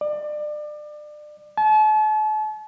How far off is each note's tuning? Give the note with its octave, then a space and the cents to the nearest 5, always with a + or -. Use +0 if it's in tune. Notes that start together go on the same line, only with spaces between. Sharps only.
D5 +30
A5 -40